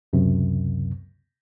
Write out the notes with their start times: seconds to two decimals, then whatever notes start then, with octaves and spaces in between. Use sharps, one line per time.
0.13 C#2 F#2 C3